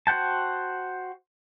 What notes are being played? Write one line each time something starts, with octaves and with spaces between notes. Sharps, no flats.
F#4 C5 F#5 G5 A5